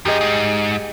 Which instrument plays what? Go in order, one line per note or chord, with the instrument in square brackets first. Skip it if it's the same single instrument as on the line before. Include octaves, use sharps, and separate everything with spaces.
[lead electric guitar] F#2 [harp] G4 G#4 D#5
[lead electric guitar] G#2 [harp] C7